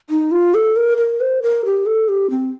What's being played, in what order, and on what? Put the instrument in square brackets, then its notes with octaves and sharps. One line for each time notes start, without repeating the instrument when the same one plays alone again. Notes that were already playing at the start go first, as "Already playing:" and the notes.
[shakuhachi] D#4
F4
A4
A#4
A#4
C5
A#4
G4
A4
G4
C4